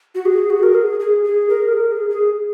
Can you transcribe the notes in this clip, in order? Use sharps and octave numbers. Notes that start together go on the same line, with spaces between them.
F#4
G#4
F#4
A#4
G#4
G#4
G#4
A#4
G#4
A#4
G#4
G#4